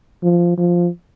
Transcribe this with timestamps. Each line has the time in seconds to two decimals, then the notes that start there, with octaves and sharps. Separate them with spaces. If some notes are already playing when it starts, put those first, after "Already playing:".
0.23 F3
0.57 F3